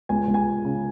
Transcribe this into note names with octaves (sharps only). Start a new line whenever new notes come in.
C#2 G#5
C#2
G#5
G#3
C#3